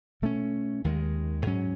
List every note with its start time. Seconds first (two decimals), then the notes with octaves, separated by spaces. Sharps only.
0.22 B2 A3 C#4
0.84 D#2 D#3 G#3
1.46 G#2 F#3 C#4